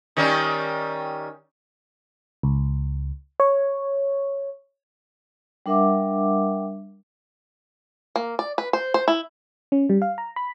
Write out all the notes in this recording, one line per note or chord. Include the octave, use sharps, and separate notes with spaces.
D#3 G3 C#4
C#2
C#5
G3 D4 A#4 E5 F#5 D6
A#3
D5
B4
C5
C5
E4
C#4
G3
F5
A#5
B5